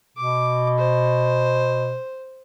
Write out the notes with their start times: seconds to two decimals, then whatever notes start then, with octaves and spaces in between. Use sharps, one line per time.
0.17 B2 D6
0.78 C5